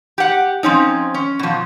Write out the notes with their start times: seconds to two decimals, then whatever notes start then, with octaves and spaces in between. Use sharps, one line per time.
0.18 G4 F#5
0.63 F3 C4 C#4 D#4
1.14 C#4
1.39 B2 F3